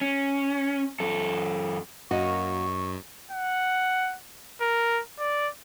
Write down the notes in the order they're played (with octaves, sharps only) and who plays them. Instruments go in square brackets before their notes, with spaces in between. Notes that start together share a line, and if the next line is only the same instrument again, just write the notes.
[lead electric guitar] C#4
F#2 A4
[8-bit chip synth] F#2 [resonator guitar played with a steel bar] A#3 F#4 [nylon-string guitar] D#5 [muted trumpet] C#6
[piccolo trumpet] F#5
A#4
D5